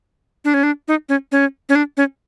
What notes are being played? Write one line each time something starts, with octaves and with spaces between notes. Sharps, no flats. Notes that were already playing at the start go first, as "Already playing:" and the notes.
D4
C#4
D4
D#4
C#4
C#4
C#4
D4
C#4